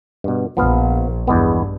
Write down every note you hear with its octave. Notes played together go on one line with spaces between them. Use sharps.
G2 B2
A#1 F3 B3 F5
E2 G2 G#3 B3